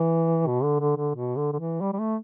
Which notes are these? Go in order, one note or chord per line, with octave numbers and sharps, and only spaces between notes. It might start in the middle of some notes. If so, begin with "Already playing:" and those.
Already playing: E3
B2
D3
D3
D3
B2
D3
D3
E3
G3
G3
A3